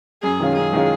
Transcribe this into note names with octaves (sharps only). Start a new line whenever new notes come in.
F#2 G#4
D#3 G#3 C#4 F4
F#2 G#4
D#3 G#3 C#4 F4